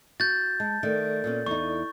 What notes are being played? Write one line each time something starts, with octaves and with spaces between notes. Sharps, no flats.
F#4 G6 A6
G#3 A5
D#3 A3 A4 D5
A#2 B3 C#4
E2 D#4 C#6